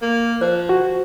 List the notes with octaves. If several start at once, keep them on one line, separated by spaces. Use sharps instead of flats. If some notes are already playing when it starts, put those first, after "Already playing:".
A#3
F3 C5
F#4